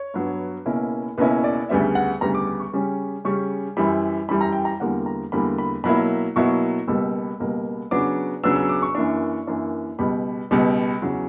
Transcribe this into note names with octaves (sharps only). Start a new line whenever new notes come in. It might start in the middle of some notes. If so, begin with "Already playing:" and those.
Already playing: C#5
G2 F#3 B3
C#2 B2 A#3 C#4 E4 A#4
C#2 B2 A#3 C#4 E4 B4
D5
D2 C#3 G3 B3 E5
F#5
D2 C#3 G3 B3 A#5
D6
D6
C#6
C#3 G3 C#4
C#3 G3 C#4 C#6
F#2 E3 G3 B5
F#2 E3 G3 B5
A#5
G5
A#5
E2 D3 G3 A#3 F#5
A#5
E2 D3 G3 A#3 B5
B5
B2 F#3 A#3 E4 B5
B2 F#3 A#3 E4 C#6
C#2 B2 G3 A#3 E6
C#2 B2 G3 A#3
C#3 F#3 B3 D4 D6
C#3 F#3 B3 D4 E6
E6
D6
C#6
F#2 E3 A#3 D4
F#2 E3 A#3 D4
C#2 B2 G3 B5
C#2 B2 G3
E2 C#3 F#3